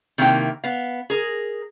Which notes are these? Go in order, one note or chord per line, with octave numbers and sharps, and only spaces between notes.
C3 D#3 A#3 E4 F#4 G5
B3 F5
G#4 A#4